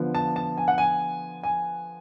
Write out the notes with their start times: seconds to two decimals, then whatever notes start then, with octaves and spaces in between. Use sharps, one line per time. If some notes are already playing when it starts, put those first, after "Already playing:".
Already playing: D3 F3 B3
0.15 A5
0.36 A5
0.57 G#5
0.68 F#5
0.78 G#5
1.43 G#5